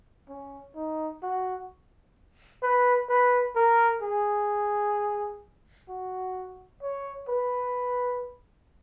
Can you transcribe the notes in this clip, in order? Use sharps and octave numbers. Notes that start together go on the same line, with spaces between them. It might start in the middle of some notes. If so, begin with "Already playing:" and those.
C#4
D#4
F#4
B4
B4
A#4
G#4
F#4
C#5
B4